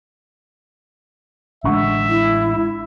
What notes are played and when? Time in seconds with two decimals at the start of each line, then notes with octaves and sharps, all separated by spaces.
1.64 A1 D3 G#3 E5 F#5 C#6
2.09 E4